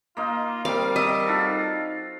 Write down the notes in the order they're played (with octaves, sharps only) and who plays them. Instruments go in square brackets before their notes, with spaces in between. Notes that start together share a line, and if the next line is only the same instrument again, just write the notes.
[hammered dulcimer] A#3 D#4 [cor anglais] F4
[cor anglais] G3 [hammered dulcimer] C4 D6 [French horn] A#4 [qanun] F5
[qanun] D#5 [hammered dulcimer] E5
[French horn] D#4 [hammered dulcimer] F4 F#4 A4